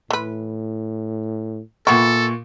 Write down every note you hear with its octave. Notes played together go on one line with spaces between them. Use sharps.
A2 E3 B4
A#2 B3 E4 A4 C#6